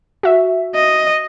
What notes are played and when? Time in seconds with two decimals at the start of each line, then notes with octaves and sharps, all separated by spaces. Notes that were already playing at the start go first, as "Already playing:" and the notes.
0.23 F#4 E5
0.75 D#5